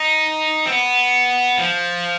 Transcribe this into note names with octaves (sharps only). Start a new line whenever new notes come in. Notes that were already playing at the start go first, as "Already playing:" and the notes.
Already playing: D#4
C4
B3
F3